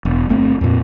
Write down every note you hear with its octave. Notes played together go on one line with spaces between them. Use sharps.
E1
G1 A3 C4
F2 A#2